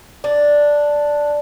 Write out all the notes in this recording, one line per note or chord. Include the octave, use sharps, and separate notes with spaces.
D4